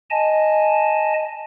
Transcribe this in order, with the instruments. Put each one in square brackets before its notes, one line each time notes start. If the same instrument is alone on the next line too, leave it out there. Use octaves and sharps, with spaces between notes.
[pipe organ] D#5 G#5 A5